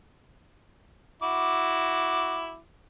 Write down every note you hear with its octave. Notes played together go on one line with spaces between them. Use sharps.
E4 F#4 D6